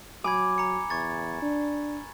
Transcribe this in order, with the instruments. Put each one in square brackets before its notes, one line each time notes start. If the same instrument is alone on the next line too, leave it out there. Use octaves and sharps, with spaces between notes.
[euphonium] F#3 [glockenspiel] G#5 B5 G#6 [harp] D6
[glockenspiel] A#5 C#7
[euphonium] E2 [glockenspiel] C#6 G#6 A6
[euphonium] D4